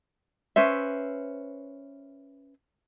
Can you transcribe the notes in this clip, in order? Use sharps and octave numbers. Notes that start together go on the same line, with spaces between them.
C#4 B4 C5 E5